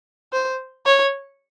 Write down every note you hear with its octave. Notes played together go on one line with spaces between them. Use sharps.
C5
C#5